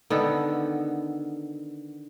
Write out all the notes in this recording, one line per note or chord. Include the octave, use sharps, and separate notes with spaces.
D3 D#3 B3 A4